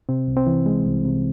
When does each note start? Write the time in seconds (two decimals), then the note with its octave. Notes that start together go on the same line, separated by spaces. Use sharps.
0.09 C3 C4
0.28 C2
0.37 C4
0.47 E3
0.66 G#3
0.86 C2
1.05 C3